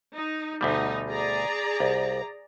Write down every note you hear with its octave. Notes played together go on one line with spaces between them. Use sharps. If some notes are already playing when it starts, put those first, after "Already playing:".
D#4
D2 B2 G3 A3 D#4
G#4 D5 A#5
C2